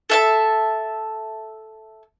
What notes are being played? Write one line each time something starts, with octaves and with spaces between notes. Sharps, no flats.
A4 E5 A5